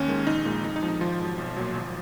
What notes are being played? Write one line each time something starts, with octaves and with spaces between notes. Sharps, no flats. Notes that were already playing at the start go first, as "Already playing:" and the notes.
Already playing: D#2 C#4
D#3 G#3
A#1 D#4
A#2 G#3
F2 D#4
D#4
F3 G#3
D#4
G#1 F3 F4
G#2 F#3
B1
A#2 F#3
G#1